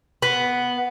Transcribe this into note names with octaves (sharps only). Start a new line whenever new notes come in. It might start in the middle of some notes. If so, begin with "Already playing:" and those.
B3